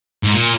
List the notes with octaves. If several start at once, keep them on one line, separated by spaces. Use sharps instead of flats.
G#2
A#2